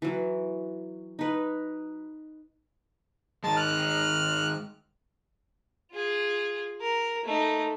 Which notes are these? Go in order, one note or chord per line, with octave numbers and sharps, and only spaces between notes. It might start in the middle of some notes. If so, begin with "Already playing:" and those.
E3 F#3
D#4 B4
D#3 G#3 A5
F6 F#6
F4 G#4
A#4
A3 D#4